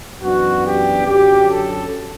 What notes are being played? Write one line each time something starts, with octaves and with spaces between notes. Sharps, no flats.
F#2 E3 B3 D4 F#4
G4
F#2 D3 F#3 C#4 G4
A4